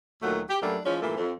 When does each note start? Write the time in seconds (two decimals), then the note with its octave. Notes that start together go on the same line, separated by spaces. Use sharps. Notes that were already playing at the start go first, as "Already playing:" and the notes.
0.22 D2 A#2 D#3 F#3 A3 F#5
0.49 G4
0.62 F#2 F#3 G3 A3 A#3 D4
0.85 E3 F3 G#3 C#4
1.02 G2 A#2 E3 A3 A#3 E4
1.17 F2